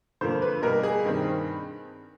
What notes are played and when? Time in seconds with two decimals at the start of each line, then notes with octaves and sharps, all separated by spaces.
0.21 F2 D3 F3 A#3 C5
0.42 B4
0.62 B2 G3 A#3 A#4
0.83 G#4
1.04 G2 D#3 G3 C4